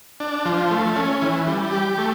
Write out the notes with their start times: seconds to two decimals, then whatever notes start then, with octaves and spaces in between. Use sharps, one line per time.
0.20 D4
0.45 F3
0.71 A3
0.96 C#4
1.22 E3
1.47 G3
1.72 G4
1.98 A3